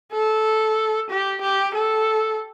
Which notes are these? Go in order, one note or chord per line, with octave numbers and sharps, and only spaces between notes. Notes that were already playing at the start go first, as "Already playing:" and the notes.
A4
G4
G4
A4